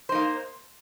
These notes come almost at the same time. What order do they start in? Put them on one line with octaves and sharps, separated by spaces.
C5 D#4 A#3